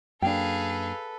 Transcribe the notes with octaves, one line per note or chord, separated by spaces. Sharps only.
F#2 A#3 D4 G#4 A4 B4 F5 G5